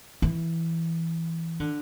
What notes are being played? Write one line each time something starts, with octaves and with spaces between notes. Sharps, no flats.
E3
D3